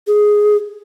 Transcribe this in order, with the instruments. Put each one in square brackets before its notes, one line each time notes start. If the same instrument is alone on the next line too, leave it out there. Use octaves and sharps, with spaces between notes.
[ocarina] G#4